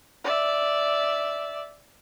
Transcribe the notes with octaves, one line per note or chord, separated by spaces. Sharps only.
D5 E5